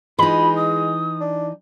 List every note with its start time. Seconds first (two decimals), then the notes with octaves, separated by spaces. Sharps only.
0.19 E3 G#3 D#4 F4 B5
0.55 D#6
1.21 D4